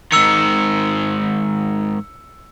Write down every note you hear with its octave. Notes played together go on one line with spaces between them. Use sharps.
G#2 D#3 E6 C#7